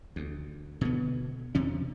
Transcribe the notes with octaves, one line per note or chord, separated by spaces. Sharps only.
D2
B2 D3 B3
E2 C3 C#4